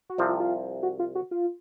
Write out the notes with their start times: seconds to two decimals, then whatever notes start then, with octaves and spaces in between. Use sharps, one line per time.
0.10 F#4
0.18 C2 C3 F3 C4 F4
0.29 F4
0.40 F4
0.83 F#4
0.99 F4
1.15 F#4
1.31 F4